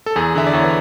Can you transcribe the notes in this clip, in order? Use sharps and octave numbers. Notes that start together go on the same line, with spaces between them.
A4
E2 G#4
D3 E5
D5
E2 C#5
B4